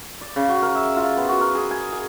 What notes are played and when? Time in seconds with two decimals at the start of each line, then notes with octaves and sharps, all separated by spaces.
0.21 D5
0.36 C#3
0.49 F#4
0.62 A#4
0.75 E5
0.97 F4
1.17 B3
1.29 F#4
1.41 A#4
1.55 G#4
1.71 G#5
1.93 G#4